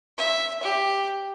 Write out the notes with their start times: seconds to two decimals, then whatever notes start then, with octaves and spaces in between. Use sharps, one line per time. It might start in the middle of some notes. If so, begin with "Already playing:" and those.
0.18 E5
0.63 G4